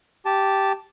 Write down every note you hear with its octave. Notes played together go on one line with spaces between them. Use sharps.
G4 A5